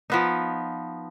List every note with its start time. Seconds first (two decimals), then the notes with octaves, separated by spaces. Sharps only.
0.10 F3 B3 D#4